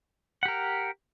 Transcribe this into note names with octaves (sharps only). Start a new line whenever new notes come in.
G4 A#4 F#5